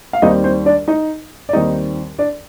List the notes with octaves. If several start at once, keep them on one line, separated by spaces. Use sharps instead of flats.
F5
D#2 D#3 G3 C4 D#4 D#5
C4 C5
D4 D5
D#4 D#5
D5
D#2 D#3 G3 C4 D#4 D#5
D4 D5